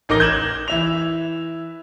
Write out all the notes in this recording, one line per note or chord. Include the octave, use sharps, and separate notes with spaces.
A1 D#4 A#4 D6 A#6 G7
G6 G#6 E7 F#7
E3 E5 F7